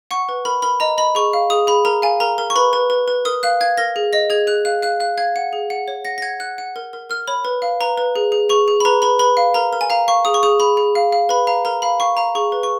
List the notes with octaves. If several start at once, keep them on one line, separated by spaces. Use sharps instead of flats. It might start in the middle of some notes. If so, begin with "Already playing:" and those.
F#5 C#6
B4
A#4 B5
A#4 B5
D#5 A#5
D#5 B5
G#4 C#6
F5
G#4 D#6
G#4 B5
A#4 A#5
F5 G#5
A#4 A#5
A#4
C#6
B4 B5
B4
B4
B4
A#4 D#6
F5 F#6
F5 G#6
A#4 A#6
G#4
D#5 A#6
G#4 G#6
G#4 F#6
F5 F#6
F5 F#6
F5 F#6
F5 G#6
F#5
G#4
F#5
C#5
F#5 A#6
A#6
F#5 G#6
F#5 F#6
F#5
A#4
A#4
A#4 F6
C#5 B5
B4
F5
B4 A#5
B4
G#4
G#4
G#4 C#6
G#4
B5
B4 A#5
B4 B5
B4 B5
F5
A#4 A#5
A#4
G#5
F5 A#5
F5 C#6
G#4 D#6
C#6
G#4 D#6
G#4 B5
G#4
F5
F5
B4 B5
F5 A#5
A#4 A#5
F5 B5
F5 C#6
F5 A#5
G#4 C#6
B4
C#6